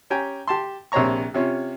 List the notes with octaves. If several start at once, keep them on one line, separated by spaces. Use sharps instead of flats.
C#4 G4 G5 G#5 A#5
G4 A5 C6
A#1 C3 C5 C#5 A#5 C#6
C3 C#4 F4